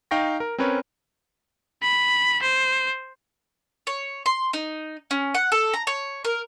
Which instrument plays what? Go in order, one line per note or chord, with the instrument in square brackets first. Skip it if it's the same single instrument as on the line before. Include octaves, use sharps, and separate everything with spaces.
[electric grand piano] D#4 F5 G5 C#6 A#6
A#4
C4 C#4 A#4 B4 C#5
[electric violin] B5
C5
[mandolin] C#5
C6
D#4
C#4
F#5
A4
A#5
C#5
A#4